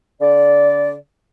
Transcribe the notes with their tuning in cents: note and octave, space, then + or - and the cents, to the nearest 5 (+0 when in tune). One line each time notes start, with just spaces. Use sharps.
D3 -40 D5 -15